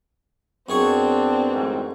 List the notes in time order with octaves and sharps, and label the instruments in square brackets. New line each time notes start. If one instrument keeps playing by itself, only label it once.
[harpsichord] F#2 G#4 C#6 [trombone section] B3 D4 [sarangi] C4
[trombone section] A1 D2 G#2